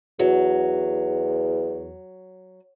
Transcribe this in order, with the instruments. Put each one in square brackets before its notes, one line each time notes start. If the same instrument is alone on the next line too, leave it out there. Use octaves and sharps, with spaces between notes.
[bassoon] E2 [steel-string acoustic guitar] F#3